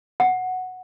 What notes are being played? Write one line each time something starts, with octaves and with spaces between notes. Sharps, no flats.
F#5